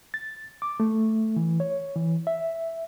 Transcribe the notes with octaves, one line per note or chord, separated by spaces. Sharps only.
A6
D6
A3
E3
C#5
E3
E5